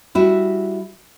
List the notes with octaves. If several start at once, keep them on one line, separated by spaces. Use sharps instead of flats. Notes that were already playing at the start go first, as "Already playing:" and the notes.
G3 E4 F#4